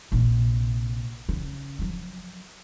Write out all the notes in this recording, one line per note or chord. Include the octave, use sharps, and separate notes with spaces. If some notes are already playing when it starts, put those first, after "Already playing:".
A#1 C3
C#3
F3 F#3